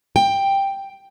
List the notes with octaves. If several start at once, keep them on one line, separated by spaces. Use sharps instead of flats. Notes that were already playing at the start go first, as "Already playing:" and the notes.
G5